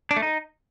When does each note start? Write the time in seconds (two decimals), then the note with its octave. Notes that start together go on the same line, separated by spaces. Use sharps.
0.11 D4
0.17 A3
0.22 D#4